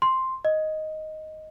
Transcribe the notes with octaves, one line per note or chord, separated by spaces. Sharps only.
C6
D#5